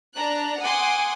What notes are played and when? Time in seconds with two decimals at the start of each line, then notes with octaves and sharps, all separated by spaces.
0.14 D4 A#5 F#6
0.60 F#5 G#5 C6 D6 D#6